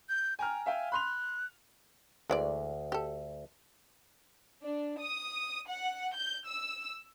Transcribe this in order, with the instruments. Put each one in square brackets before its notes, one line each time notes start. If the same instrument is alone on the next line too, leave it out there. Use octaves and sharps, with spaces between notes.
[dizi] G6
[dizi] G5 [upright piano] G#5 A#5 F6
[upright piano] E5 F5 G5 [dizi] G#5
[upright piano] B5 C6 F7 [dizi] F#6
[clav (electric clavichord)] D2 [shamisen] E3 G#3 D5
[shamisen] G4 A4
[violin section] D4
D#6
F#5
G6
E6